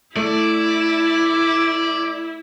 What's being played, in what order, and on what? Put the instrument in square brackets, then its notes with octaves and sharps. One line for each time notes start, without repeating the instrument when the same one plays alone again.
[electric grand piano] A3 [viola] E4 [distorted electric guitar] D5